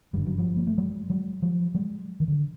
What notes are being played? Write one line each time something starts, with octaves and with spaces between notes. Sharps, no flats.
G1 F#2 D3 G3
F#3
F3 G3
A#3
A3
F#3 G#3
F#3 G#3
F3 G3
F#3 G#3
D#3
D3